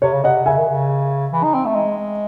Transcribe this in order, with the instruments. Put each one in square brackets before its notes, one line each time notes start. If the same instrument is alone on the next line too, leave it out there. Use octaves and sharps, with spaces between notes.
[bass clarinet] C3 [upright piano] C#5
[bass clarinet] C#3
[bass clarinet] C3 [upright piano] D#5 F#5
[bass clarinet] C#3 [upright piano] E5 G#5
[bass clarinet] D#3
C#3
E3
D#4
C4
A3
G#3